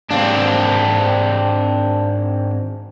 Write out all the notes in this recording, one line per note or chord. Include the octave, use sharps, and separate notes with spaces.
G#2 D#3 C4 D4 F5